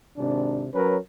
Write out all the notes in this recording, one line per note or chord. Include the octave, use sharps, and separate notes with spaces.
G#1 C3 D4
F#3 C#4 A#4 B4